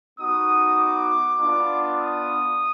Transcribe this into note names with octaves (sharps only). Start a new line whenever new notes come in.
B3 D#4 F#4 D#6
D6
B3 D4 F4
D#6